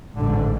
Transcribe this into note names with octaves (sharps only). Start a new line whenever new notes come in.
A1 G#2 D3